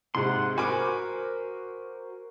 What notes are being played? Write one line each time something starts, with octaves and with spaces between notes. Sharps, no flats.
G#2 C3 F#5 C6
F#4 A#4 C5 G#5 B5 D6